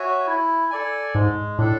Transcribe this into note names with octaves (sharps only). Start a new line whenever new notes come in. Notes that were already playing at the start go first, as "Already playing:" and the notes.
Already playing: F#4 C#5 E5 G#5
E4
A4 D5 G#5
G#2 G#3
A2 D4 A4